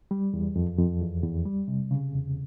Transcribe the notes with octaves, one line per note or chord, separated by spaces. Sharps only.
G3
E2
F2
F2
E2
E2
G3
C3
C#3
E2